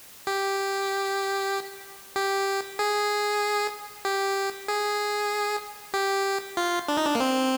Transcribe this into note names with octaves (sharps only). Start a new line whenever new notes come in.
G4
G4
G#4
G4
G#4
G4
F4
D4
D#4
D4
A#3
C4